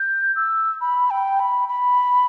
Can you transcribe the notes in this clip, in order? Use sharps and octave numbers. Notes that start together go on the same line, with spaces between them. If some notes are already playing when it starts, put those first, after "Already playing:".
Already playing: G6
E6
B5
G5
B5
B5